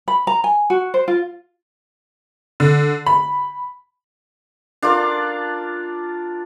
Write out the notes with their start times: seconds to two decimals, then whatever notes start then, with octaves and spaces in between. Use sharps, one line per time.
0.08 B5
0.27 A#5
0.44 G#5
0.70 F#4
0.94 C5
1.08 F4
2.60 D3
3.06 B5
4.82 D4 F4 A#4 D5